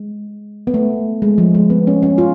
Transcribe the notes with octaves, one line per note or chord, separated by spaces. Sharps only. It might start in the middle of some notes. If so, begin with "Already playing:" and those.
Already playing: G#3
B3
A3
G#3
F3
G#3
B3
C#4
C#4
F4